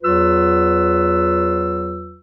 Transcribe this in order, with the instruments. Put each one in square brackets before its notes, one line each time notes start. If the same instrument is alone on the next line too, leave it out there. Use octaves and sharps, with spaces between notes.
[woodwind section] E2 F#3 F4 B4 E6